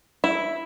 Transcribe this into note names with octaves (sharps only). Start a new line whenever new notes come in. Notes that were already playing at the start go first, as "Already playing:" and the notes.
E4